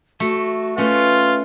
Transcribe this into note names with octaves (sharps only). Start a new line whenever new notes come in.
A3 F#4
A3 C#4 F4 B4